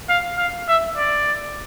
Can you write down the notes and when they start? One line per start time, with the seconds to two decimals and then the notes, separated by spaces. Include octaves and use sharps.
0.09 F5
0.38 F5
0.68 E5
0.97 D5